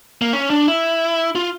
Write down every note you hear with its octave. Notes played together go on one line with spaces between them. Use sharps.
A#3
C#4
D4
E4
F4